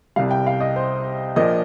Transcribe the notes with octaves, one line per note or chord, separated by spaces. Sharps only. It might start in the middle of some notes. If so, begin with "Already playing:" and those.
C2 C3 G3 F5
G5
F5
D#5
C5
A#1 A#2 F3 D#5